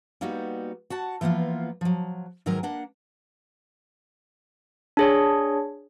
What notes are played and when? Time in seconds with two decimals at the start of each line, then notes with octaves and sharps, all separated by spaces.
0.21 G3 A#3 B3 D#4 F#4
0.90 F#4 F#5 A5
1.21 E3 F3 A#3 B3 F4
1.81 F3 F#3
2.46 G#2 D#3 F#3 G#3 A#4 G#5
2.63 A#3 D4 F#5
4.97 D4 G#4 C#5